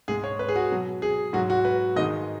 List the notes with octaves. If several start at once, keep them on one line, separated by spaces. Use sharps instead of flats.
G#2 G#3 G#4
C#5
B4
G#4
F#4
B2 F#3
G#4
G#2 F#3 F#4
F#4
B4
G#2 D#3 G#3 D#5